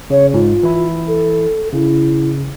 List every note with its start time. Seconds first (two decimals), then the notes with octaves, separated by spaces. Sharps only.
0.10 C#3 C#5
0.34 G#2 F4
0.63 E3 E4
1.07 A4
1.73 C#3 E4